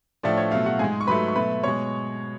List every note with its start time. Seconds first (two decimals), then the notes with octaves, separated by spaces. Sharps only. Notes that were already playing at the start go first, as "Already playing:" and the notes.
0.23 A2 F3 A3 D4 D5
0.37 C#5
0.51 B2 F#3 A3 F4 F5
0.66 F#4 F#5
0.79 G#2 G#3 G#4 G#5
1.01 C#6
1.07 G#2 F#3 A3 B4 B5
1.28 C#6
1.35 B2 F#3 A3 B4 B5
1.63 B2 G#3 C#5 C#6